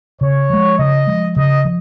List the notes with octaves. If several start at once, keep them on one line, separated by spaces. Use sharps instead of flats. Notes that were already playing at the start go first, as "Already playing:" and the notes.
C#3 C#5
F3 G#3
C#3 D#5
F3 G#3
C#3 D#5
F3